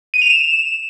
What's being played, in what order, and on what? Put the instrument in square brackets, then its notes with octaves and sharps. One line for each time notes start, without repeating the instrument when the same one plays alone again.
[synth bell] D#7
F7
E7